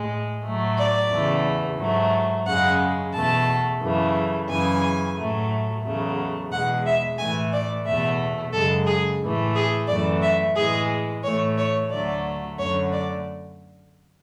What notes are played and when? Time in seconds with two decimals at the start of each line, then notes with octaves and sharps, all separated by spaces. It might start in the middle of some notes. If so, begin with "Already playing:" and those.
Already playing: A2 G#3
0.44 A2 F#3 A3
0.78 D5
1.11 E2 C#3 E3 A3
1.79 G#2 F#3 A3
2.46 F#2 C#3 G#3 F#5
3.14 E2 B2 A3 A5
3.81 F#2 C#3 E3 A3
4.48 F#2 C#3 E3 G#5
5.16 A2 F#3 A3
5.83 E2 C#3 F#3 A3
6.51 E2 B2 G#3 F#5
6.85 E5
7.18 A2 E3 A3 G#5
7.53 D5
7.85 E2 B2 A3 E5
8.53 F#2 C#3 G#3 A4
8.87 G#4
9.21 A2 E3 A3
9.55 G#4
9.88 F#2 E3 A3 D5
10.22 E5
10.56 A2 E3 G#3 G#4
11.23 A2 E3 A3 C#5
11.57 C#5
11.90 D2 D3 F#3 A3 D5
12.58 F#2 D3 A3 C#5
12.92 D5